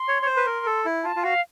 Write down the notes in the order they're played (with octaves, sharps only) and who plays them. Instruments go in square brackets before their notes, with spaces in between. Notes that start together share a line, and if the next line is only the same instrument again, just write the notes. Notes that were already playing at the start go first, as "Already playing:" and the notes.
Already playing: [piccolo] C6
[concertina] C#5
C#5
C5
B4
A#4
A4
E4
[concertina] F4 [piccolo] A5
[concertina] F4
[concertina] F#4 [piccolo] F5